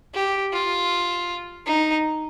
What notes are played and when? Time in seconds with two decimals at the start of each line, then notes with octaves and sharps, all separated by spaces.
0.14 G4
0.53 F4
1.66 D#4